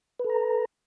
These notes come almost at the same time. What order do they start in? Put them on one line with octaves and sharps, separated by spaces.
B4 A4 A#5